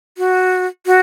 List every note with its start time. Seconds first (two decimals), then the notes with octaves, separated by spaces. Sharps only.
0.18 F#4
0.86 F#4